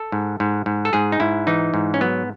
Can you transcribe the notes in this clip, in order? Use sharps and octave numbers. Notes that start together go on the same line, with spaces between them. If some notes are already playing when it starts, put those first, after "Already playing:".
Already playing: A4
G#2
G#2
G#2
A4
G#2 G#4
D#4
G#2 E4
E3 D#4
G#2
C#4
F#3 B3